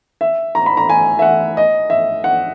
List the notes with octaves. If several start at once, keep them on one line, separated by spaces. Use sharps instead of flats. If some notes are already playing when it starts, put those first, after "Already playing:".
E5
A#5
B5
A#5
G#5
E5
F#5
D#5
E5
F#5